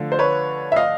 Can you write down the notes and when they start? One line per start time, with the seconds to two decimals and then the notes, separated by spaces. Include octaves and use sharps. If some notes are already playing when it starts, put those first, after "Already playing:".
Already playing: D3 F3 A3
0.12 C5
0.19 B4 C#5
0.72 E5
0.76 D#5 F5